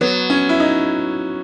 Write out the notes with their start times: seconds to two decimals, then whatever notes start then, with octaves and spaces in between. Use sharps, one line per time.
0.01 F#3 B3
0.30 C#4
0.49 E4
0.60 D#4